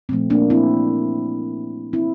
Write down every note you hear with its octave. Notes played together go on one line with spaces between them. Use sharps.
A#2 F3 A3 C4
A#3 D4
C4 E4
C4 E4